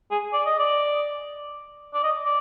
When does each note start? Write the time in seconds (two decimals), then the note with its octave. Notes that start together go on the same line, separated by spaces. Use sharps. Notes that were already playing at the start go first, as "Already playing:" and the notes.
0.11 G#4
0.33 D5
0.46 D#5
0.59 D5
1.94 D5
2.03 D#5
2.25 D5